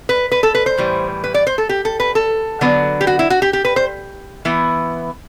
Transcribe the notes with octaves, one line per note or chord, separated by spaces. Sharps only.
B4
B4
A4
B4
C5
A2 E3 G3
B4
D5
C5
A4
G4
A4
B4
A4
D3 F#3 B3 D4
G4
F#4
E4
F#4
G4
G4
B4
C5
E3 B3 E4